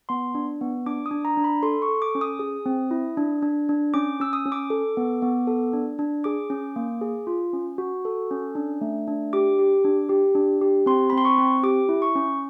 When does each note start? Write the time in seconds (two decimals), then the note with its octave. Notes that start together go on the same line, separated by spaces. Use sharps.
0.09 B3 C6
0.35 D4
0.61 B3
0.86 D4 D6
1.06 D#6
1.11 D4
1.25 A#5
1.37 D4
1.44 B5
1.63 A4 C6
1.82 C#6
1.89 A4
2.02 D6
2.15 C#4
2.21 D#6
2.39 G#4
2.66 C4
2.91 E4
3.17 D4
3.42 D4
3.69 D4
3.94 C#4 D6
4.20 C#4 E6
4.33 D#6
4.46 C#4
4.52 D6
4.70 A4
4.97 B3
5.22 B3
5.47 A4
5.73 D4
5.99 D4
6.24 G#4 D6
6.50 C#4
6.76 A#3
7.01 G#4
7.27 F4
7.53 C#4
7.78 F#4
8.05 A4
8.31 C#4
8.55 D4
8.81 A3
9.08 D4
9.33 G4 D6
9.59 G4
9.85 D4
10.09 G4
10.35 D4
10.61 G4
10.86 C4 C6
11.10 B5
11.13 C4 C6
11.25 C#6
11.38 C4
11.63 G4 D6
11.89 E4
12.02 C#6
12.16 C#4